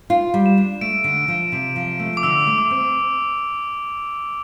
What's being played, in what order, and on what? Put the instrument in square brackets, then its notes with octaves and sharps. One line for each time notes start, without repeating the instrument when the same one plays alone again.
[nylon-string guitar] F4
G3
[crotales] E7
[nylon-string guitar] D4
[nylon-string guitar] A3 [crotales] D7
[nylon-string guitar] D3
F3
C3
F3
A3
[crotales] D6
[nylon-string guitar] D3 [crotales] E6
[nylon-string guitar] A3
[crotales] D6
[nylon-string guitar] C4